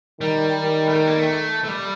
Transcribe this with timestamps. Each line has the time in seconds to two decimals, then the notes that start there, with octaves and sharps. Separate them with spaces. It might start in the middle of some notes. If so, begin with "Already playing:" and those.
0.21 D#3 G3
0.57 D#3
0.89 A3
0.94 G3
1.07 A#3
1.19 A3
1.64 A3
1.68 G3